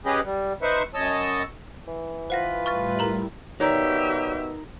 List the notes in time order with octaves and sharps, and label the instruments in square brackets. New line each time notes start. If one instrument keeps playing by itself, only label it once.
[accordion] C#4 G4 G#4 B4 D#5
G3
D#4 B4 C5 E5 C#6
F#2 C#5 D#5 A5 E6
[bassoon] E3
[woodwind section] F4 B4 [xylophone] C5 F#5 A#6
[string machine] A2 G3 E4 [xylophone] C#6 F6 A6
[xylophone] A#4 A#5 F#7
[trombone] B2 [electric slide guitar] D#4 A#4 [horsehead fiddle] G4 E5 [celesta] C#5 D5 A#5